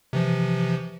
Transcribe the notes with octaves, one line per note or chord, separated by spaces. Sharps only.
C3 E3 F3